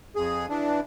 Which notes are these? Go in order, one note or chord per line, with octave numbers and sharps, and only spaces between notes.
F2 G#4
E3 D4